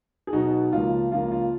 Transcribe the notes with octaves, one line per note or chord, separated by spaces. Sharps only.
G#4
B2 F#3 B3 D#4 F#4
C#2 C#3 F3 A#3 F4
C#2 C#3 F3 A#3 F4
F4